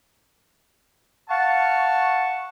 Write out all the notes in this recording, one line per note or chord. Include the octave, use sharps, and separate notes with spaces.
F5 F#5 A5 C#6